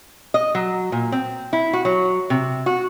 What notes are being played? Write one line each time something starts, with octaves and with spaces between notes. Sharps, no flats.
D#5
F#3
A#2
C4
E4
F#4
F#3
C3
F#4